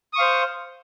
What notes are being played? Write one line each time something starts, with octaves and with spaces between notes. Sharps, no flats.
C5 F5 C#6 D#6